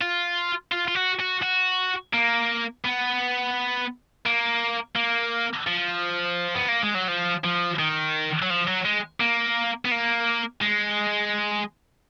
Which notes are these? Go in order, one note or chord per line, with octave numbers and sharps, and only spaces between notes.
F4
F4
F4
F#4
F#4
F#4
A#3
B3
A#3
A#3
F3
B3
A#3
G#3
F#3
F3
F3
D#3
F#3
F3
F#3
G#3
A#3
B3
A#3
G#3